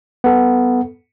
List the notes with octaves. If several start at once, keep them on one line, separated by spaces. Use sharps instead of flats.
B3 A4